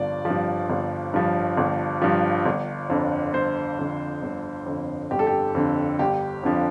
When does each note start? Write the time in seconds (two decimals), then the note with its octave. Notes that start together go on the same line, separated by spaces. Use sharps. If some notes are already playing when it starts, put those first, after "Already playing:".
Already playing: G1 G2 F3 D5
0.25 F3
0.30 G2
0.70 G1
1.14 G2 F3
1.57 G1
2.02 G2 F3
2.46 G1
2.90 F2 D3
3.34 G1 C5
3.79 F2 D3
4.22 G1
4.66 F2 D3
5.11 G1 G4
5.19 A4
5.27 G4
5.55 F2 D3
5.99 G1 G4
6.43 F2 D3 F3